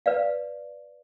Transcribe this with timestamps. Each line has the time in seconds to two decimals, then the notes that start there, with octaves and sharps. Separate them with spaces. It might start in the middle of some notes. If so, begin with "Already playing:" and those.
0.06 B4 D5 F5